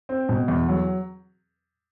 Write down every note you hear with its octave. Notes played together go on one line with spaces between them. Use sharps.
C4
B2
E2
F#3